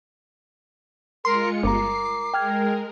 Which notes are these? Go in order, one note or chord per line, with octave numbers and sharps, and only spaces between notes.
G#3 F4 A#4 C6 C#7
G1 A#4 A#5 D6 C7
G#3 A#4 G5 F6 G#6